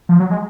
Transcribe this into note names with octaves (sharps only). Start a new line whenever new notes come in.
F3
F#3
G#3